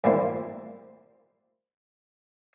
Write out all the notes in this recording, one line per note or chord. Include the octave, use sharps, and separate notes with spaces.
G#2 G3 A#3 C4 E4 F4